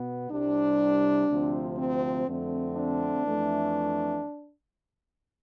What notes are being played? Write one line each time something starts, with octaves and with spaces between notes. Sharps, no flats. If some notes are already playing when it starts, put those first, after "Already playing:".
Already playing: B2 B3
C2 C3 G3 D4
D2 C3 F3 C4
C4
F2 D3 A3 C4
D4
F2 E3 A3